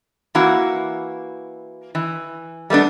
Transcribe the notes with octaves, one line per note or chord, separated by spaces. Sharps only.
E3 A#3 E4 F#4
E3
G3 A3 B3 D4